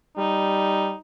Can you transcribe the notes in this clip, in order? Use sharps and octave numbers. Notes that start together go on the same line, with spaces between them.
G3 D#4